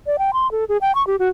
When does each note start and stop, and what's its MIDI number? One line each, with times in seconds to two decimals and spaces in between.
0.07 0.17 74
0.19 0.31 79
0.33 0.50 84
0.52 0.64 69
0.69 0.77 68
0.81 0.94 79
0.95 1.05 85
1.07 1.16 67
1.19 1.29 66